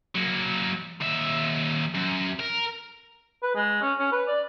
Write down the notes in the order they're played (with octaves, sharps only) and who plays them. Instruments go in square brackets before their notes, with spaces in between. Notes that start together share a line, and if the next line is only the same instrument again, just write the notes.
[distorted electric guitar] F#3 A#3
D#2 E5
F#2
A#4
[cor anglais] B4
G#3
C#4
C#4
B4
D5